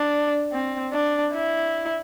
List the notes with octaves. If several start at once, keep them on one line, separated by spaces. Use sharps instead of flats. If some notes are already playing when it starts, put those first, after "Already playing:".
Already playing: D4
C4
D4
E4